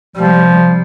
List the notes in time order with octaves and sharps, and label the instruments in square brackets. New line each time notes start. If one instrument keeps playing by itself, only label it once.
[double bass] C3 G3 [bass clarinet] F3